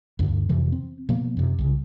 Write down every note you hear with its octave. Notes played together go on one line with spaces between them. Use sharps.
D2 G2 D3
F2 C3 E3 F3
C4
B2 F3 A#3 B3
F#2 C3
C2 C#3